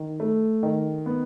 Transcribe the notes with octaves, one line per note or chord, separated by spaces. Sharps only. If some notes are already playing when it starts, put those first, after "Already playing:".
Already playing: D#3
A3
D#3
B3